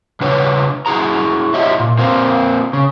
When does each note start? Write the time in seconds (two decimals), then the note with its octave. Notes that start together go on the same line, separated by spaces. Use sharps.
0.21 C#3 D4 B4 C#5
0.86 E4 F#4 G#4 A#5
1.54 E4 F4 G4 C#5 D#5 E5
1.80 A#2
1.99 A#3 C4 F4
2.73 C#3